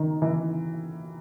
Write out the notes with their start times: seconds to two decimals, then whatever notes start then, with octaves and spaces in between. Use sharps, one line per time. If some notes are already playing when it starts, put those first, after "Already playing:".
Already playing: D#3
0.22 E3